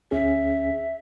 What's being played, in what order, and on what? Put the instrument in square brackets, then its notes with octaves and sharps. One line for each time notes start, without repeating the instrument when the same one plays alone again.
[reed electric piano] D2 C#4 G#4 [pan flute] E5